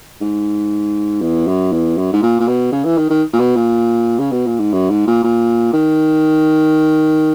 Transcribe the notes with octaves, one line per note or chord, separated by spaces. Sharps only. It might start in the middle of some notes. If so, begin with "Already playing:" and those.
G#2
E2
F#2
E2
F#2
G#2
A#2
A#2
B2
C#3
E3
D#3
D#3
A#2
B2
A#2
C#3
B2
A#2
G#2
F#2
G#2
A#2
A#2
D#3